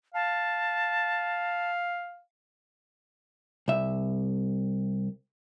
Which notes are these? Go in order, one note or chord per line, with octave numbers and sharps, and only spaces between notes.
F5 A5
C2 E5